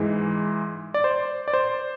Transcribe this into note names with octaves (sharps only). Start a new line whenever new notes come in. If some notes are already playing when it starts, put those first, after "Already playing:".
Already playing: G#2 E3 G#3
D5
C5
D5
C5